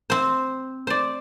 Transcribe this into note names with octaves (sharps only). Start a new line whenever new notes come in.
C4 C5
C5 D5